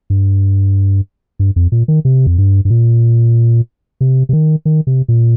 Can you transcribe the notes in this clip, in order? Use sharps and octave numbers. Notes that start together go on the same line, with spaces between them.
G2
G2
F2
A#2
D#3
C3
F2
G2
G2
A#2
C3
C3
D#3
D#3
C3
A#2